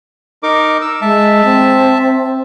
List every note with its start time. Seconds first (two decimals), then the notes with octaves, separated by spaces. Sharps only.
0.43 D#4 A#4 D6
0.81 E6
1.02 G#3 E5 A5
1.45 C4